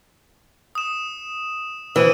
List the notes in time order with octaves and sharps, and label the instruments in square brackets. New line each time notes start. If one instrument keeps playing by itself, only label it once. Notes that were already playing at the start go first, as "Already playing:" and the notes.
[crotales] D#6 E7
[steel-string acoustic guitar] E3 [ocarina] C5 [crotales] E6 D#7